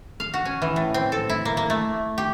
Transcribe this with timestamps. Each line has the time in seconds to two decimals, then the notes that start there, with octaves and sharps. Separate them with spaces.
0.20 F5
0.34 F#4
0.45 C#4
0.62 E3
0.76 A2
0.94 C4
1.12 A4
1.29 E4
1.45 A#3
1.57 A#3
1.70 A3
2.18 G4